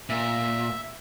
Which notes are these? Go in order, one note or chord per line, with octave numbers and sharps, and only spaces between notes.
A#2 E5